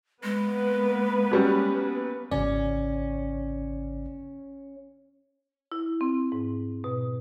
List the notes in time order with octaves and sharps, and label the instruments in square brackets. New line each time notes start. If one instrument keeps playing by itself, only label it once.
[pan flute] G#3 [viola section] A#3 B3 B4
[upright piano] F#3 G3 C#4
[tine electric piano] G#1 C#3 D5 [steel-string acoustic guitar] C#4
[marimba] E4
C4
G#2
B2